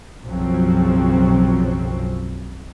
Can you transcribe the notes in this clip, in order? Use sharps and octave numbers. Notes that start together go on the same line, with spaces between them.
B1 F#2 C#3 F3 F#3 C4